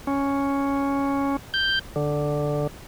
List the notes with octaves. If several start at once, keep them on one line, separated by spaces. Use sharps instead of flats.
C#4
G6
D3